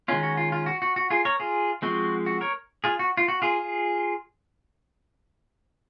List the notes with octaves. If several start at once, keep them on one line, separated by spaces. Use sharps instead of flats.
D#3 G#3 C#4 F4
F#4
F4
F4
F#4
F#4
F#4
F4 G#4
A#4 C#5
F4 G#4
F3 G#3 C4 F#4
F#4
A#4 C#5
F4 G#4
F#4
F4
F#4
F4 G#4